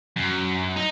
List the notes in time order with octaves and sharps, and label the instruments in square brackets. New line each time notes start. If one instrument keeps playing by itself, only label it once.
[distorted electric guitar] F#2
D#4